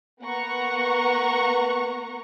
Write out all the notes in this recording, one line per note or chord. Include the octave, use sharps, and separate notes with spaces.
A#3 B3 B4 F#5 A#5 C#6